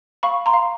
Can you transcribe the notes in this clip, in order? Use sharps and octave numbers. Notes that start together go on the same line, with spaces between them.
F5 B5 C#6
A#5 C6
F5